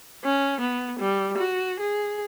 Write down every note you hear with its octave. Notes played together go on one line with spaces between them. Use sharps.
C#4
B3
G3
F#4
G#4